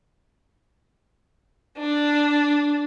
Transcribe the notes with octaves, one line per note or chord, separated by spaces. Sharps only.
D4